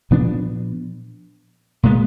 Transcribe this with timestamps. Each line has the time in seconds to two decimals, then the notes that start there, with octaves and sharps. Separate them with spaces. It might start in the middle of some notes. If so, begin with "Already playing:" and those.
0.11 A#2 F3 B3 D4
1.83 A#2 G#3 B3